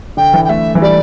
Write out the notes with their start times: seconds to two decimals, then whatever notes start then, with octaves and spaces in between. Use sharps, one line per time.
0.17 D3 G5
0.34 E3
0.45 G5
0.49 A3 E5
0.75 E3
0.82 G3 D5